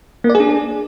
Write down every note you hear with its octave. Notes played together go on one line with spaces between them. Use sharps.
A#3
D5
G#4
D4